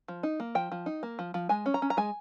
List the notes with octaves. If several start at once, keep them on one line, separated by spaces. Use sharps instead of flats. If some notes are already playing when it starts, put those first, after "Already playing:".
F3
D#4
A#3
F3 G5
F3
D#4
A#3
F3
F3
G#3 G#5
C#4
A#5
C#4
A#5
G#3 G#5